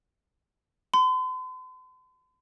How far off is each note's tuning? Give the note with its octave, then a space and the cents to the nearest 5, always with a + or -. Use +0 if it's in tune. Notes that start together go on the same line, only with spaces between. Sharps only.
C6 -45